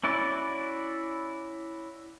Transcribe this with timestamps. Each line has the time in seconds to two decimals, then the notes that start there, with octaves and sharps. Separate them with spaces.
0.04 C#4 E4 F#4 D5